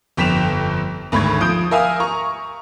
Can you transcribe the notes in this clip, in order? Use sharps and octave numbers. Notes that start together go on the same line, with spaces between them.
G1 F2 G5 B6 E7 F7
G#1 D2 B5 C#6 G#6
F3 D#6 G6 D7
A#4 E5 F5 G#5 D#6
A#5 C#6